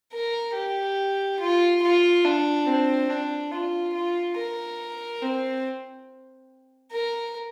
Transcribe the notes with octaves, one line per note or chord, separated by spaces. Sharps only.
A#4
G4
F4
F4
D4
C4
D4
F4
F4
A#4
C4
A#4